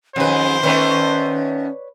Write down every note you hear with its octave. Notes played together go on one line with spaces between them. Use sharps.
F2 D#3 F#3 C#4 G#4 B4 C5
D#3 A3 B3 C#4 B4 C#5 D5